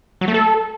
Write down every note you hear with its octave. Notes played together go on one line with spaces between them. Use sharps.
F#3
A3
A4